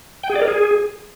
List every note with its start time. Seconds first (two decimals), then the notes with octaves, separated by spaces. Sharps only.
0.24 G5
0.30 G#4
0.36 D5
0.42 A#4
0.48 G#4